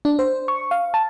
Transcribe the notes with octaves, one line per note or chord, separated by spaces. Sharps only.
D4
C5
C#6
F5
A5